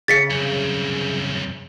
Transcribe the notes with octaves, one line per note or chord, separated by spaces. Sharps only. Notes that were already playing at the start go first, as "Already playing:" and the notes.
C#3 G#4 A6 B6 C#7
C2 F#2